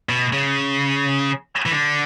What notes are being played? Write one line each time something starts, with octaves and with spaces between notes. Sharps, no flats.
B2
C#3
E3
D3